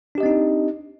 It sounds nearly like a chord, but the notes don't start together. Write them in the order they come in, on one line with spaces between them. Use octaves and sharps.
D4 G4 D#5 C4 D#4